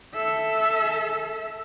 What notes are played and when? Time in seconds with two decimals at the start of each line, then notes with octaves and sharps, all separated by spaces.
0.14 A4 E5